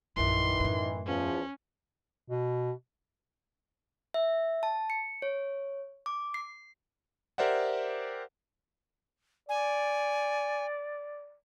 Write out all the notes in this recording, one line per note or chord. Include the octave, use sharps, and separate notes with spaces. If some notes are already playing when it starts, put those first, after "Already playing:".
A#1 F#2 D#3 E3 C6
F#2 A2
E2 F3 C#4
B2
E5
A5
C#7
C#5
D6
C7
G4 A#4 C5 D5 E5 F#5
D5 G#5